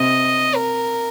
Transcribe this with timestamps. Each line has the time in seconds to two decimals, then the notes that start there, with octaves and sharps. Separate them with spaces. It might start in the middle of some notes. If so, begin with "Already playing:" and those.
Already playing: C3 C4 D#5
0.55 A#4